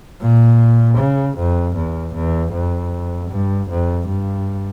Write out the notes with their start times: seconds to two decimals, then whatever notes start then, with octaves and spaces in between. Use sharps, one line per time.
0.21 A#2
0.99 C#3
1.38 F2
1.76 E2
2.15 E2
2.53 F2
3.31 G2
3.70 F2
4.09 G2